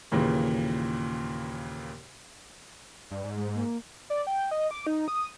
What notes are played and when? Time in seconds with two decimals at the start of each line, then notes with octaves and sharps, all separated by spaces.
0.12 D#2 A#2 C#3 E3
3.11 G2 D5
3.24 G#2
3.36 G#3
3.54 A#3
4.10 D5
4.27 G5
4.51 D#5
4.71 D6
4.87 D#4
5.08 D#6